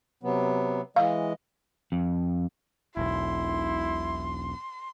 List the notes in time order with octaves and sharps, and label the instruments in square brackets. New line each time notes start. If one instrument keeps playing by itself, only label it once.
[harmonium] C3 F#3 B3
[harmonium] E3 G#3 D#5 [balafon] F5
[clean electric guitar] F2
[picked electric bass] E1 B1 [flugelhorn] E4 [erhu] C6